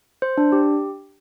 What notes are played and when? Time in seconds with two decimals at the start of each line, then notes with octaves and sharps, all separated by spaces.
0.22 C5
0.38 D4
0.52 G4